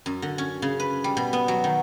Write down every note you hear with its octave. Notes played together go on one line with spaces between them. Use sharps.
F#2
D3
C#4
C#3
B4
G3
B2
B3
F#3
D#3